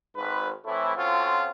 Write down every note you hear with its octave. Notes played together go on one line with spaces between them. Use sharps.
G#1 G#2 B4
A2 E3 A3 C4 E4
F3 C4 C#4 F4 F#4 A4